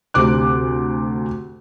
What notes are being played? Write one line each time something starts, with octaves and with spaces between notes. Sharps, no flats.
D2 C3 D6 F#6